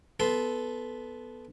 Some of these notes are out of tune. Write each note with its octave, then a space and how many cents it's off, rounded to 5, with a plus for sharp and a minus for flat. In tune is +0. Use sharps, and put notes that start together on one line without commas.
B3 +0 A4 -15 C6 +0